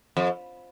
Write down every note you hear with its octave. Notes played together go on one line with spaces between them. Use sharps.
F2